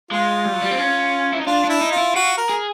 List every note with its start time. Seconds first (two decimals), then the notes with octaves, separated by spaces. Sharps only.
0.11 G#3 F4
0.45 G3
0.53 F#3
0.61 G3
0.71 C4
0.78 C#4
1.32 E4
1.39 D#4
1.47 D4 F4
1.64 D4 E4
1.81 D#4
1.92 F4
1.97 E4
2.15 F4 F#4
2.37 A#4
2.49 G#4